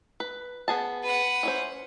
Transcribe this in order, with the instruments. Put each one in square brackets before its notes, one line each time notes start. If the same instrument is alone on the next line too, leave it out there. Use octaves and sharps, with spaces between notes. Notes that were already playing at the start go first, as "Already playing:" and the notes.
[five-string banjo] B4
B3 G#4 A5
[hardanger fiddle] B4 F#5
[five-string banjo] E3 C#4 C5